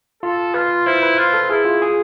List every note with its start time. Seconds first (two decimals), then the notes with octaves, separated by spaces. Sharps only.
0.23 F4 A4
0.54 F4 B4
0.86 E4 C5
1.03 B4
1.18 F4 B4
1.34 A4
1.50 E4 G#4
1.65 F4
1.82 G#4